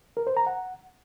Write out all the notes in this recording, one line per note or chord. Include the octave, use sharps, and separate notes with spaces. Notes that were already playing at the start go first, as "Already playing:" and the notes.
A#4
C5
A#5
F#5